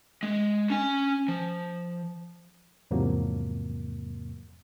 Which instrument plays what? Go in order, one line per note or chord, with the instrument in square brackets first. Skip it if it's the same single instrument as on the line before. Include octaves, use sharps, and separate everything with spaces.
[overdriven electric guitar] G#3
C#4 G#5
F3
[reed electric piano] E2 G#2 C3 F3 F#3 A#3